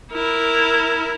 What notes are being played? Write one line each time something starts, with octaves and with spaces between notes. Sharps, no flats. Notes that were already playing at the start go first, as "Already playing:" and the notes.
E4 A#4